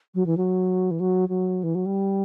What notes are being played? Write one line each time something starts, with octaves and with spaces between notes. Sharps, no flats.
F#3
E3
F#3
E3
F#3
F#3
E3
F#3
G3